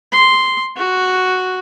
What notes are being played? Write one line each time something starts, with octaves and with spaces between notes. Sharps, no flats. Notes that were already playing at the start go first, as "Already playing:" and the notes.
C6
F#4